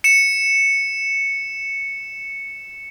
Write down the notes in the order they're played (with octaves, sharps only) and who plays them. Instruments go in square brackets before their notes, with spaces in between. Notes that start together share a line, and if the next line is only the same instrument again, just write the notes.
[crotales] C#7 E7